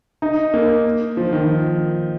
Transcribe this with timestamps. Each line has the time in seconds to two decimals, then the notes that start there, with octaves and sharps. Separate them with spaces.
0.22 D#4
0.54 A#3
1.17 F3
1.33 D#3